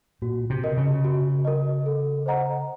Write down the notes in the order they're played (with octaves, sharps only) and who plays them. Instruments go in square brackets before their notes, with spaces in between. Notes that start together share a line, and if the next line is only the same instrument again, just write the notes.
[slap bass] A#2 [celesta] F#4
[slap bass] C3
[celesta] A#4 D#5
[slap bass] C#3
[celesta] F#4
A#4 D#5
A4
C5 D#5 F#5 A#5